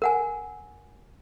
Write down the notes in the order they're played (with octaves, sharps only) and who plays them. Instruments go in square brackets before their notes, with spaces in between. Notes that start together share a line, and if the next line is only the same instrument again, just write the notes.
[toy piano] A#4 F#5 G#5